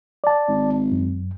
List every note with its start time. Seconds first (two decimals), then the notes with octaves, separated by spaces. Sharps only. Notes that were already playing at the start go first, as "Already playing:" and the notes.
0.24 D5 A5
0.48 G#1
0.92 F#2